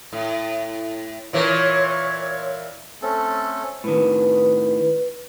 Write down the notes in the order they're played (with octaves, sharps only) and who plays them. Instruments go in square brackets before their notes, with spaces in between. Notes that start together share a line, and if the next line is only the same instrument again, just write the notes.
[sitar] A2
[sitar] A#2 E3 A#4 [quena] C#5
[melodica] A3 C4 C#4 A4
[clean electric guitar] A2 D#3 [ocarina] B4